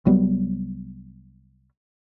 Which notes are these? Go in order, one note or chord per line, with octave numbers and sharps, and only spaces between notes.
C2 F#3 G3 B3